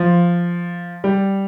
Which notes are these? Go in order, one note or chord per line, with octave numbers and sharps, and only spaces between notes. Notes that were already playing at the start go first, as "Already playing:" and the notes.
Already playing: F3
G3